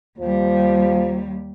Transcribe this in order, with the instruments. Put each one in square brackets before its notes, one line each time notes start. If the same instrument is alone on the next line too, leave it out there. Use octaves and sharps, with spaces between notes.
[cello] D#2 G3 [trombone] F3